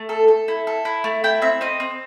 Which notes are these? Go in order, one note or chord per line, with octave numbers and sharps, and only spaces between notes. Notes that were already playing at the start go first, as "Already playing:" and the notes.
Already playing: A3
A4
A4
E4
A4
E4
A3
E4 G5
C4 E5
C4 D#5
C4